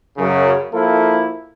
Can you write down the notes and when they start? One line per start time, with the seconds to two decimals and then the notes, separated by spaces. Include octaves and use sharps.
0.17 F#2 C#3
0.73 F3 A#3 E4 A4